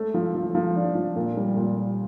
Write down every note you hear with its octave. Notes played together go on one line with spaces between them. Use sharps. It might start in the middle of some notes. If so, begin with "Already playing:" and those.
Already playing: A3
F3
F3
F3
D4
F3
A#2
G3
A#2